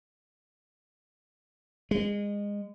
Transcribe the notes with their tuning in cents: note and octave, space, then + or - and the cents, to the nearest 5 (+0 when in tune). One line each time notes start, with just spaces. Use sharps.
G#3 -25